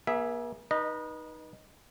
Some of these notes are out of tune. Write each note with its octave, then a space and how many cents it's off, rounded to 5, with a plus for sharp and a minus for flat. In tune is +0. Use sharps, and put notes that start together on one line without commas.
A#3 +45 G#4 +0 E5 +0
D#4 +0 B4 -30 D#5 -20